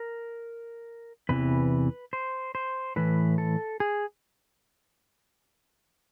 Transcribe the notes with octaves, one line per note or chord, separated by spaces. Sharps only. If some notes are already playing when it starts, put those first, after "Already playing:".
Already playing: A#4
E2 C3 E3 B4
C5
C5
A2 E3 B4
A4
G#4